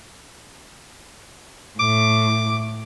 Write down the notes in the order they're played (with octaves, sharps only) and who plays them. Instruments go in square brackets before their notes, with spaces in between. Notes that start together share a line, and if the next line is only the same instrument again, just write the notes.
[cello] A2 [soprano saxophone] D6